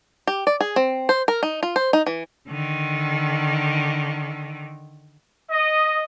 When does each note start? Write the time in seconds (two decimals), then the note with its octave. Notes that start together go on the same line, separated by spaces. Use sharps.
0.27 G4
0.47 D5
0.61 G#4
0.76 C4
1.09 C5
1.28 A#4
1.43 D#4
1.63 F4
1.76 C5
1.93 D#4
2.07 E3
2.49 D3 D#3
5.50 D#5